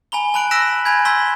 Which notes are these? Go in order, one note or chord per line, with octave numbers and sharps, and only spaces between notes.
G#5 A#5 B5 G7
A5 B5 F#6 D7 F#7
E6 F#6 A#6 B6 D7 E7
G#5 B5 G6 G#6
A#5 C6 E6 G#6 B6 G7